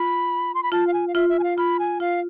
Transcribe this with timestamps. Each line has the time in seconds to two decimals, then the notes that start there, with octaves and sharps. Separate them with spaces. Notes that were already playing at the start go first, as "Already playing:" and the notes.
Already playing: F4 B5
0.54 C6
0.63 B5
0.72 F4 A5
0.87 F5
0.93 G#5
1.07 F5
1.15 F4 E5
1.29 E5
1.39 G#5
1.43 F5
1.58 F4 B5
1.79 G#5
2.00 F4 F5